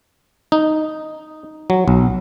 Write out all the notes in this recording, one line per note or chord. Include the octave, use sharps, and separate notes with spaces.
D#4
F#3
B1